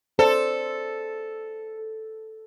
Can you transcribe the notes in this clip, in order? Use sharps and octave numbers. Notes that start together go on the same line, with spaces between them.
A4 C5 D5